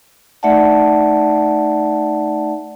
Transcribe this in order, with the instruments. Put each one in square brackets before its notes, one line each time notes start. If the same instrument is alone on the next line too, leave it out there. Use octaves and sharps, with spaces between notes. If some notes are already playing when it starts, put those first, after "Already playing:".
[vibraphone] A3 D#4 D5 E5 F#5 A5